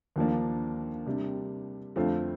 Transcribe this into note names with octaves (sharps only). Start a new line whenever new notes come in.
D#2 D3 F3 A#3 D4
C3 G3 D4
F2 D3 A3 C4 F4